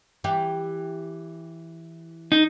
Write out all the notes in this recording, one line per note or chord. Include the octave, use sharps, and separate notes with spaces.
E3 G4
D#4